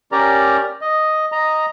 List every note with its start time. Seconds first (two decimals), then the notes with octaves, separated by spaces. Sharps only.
0.12 C#4 G4 A#4 D5 A#5
0.81 D#5
1.32 D#5 A#5